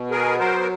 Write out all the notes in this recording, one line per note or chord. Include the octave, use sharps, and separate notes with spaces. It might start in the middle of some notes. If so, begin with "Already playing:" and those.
Already playing: B2
B3 G#4 A#4
F#3 A#4 C5
A#4